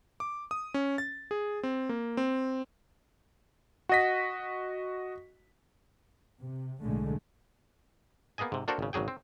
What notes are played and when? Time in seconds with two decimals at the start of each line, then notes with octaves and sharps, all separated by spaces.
0.20 D6
0.51 D#6
0.74 C#4
0.98 A6
1.31 G#4
1.63 C4
1.89 A#3
2.17 C4
3.89 F#4 D#5 F#5 A#6 B6
6.41 C3
6.82 B1 A2 D3 G#3 A3
8.38 A#3 B3 G#4 D#5 G#5
8.52 G#2 C3
8.68 A#3 D4 F#4 A4 A#4 C5
8.79 G#1 C#3
8.93 G#1 C#3 F#3 G#4 G5
9.08 C4